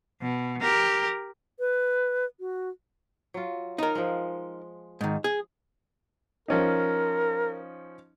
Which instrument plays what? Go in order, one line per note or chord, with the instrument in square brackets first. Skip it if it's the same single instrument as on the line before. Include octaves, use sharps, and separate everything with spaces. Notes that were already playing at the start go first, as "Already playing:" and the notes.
[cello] B2
G4 A#4
[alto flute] B4
F#4
[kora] F#3 F4
[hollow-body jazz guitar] D#4 A#4
[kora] F3 G#3
[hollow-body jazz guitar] G#2 D#3
G#4
[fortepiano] F3 C#4 D#4 [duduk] A#4